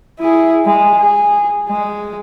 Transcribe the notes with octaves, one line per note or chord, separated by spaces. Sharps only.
E4 G#4
G#3
G#4
G#3